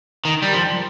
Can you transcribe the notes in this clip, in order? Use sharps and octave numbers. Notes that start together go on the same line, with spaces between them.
D#3
G3
F3